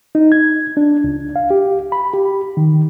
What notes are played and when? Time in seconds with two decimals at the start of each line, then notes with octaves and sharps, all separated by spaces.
0.15 D#4
0.32 G#6
0.77 D4
1.04 C#2
1.36 F5
1.50 G4
1.92 B5
2.13 G4
2.57 D#3